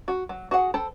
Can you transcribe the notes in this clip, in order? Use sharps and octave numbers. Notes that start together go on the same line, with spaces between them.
F#4
F#3
F#4 G#4 F#5
A4 C5 G5 A5 B5